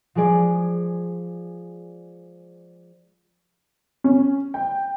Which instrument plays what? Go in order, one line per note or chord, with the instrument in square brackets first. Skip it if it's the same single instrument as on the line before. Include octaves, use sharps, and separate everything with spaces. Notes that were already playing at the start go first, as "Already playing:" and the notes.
[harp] F3 G#3 G#4 D5
[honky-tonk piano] C#4
G5